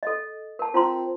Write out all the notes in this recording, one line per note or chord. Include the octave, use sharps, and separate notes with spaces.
A4 D#5
A#4 A5
C4 F4 A#5 C6